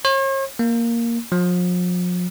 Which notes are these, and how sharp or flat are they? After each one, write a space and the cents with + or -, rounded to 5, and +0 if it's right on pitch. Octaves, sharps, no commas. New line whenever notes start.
C#5 -45
A#3 +0
F3 +40